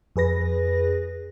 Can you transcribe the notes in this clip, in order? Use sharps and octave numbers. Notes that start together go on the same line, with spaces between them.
F2 G#4 B4 A#6